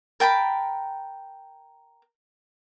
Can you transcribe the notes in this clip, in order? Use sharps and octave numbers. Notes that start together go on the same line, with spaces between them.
A#4 G5 A5 B5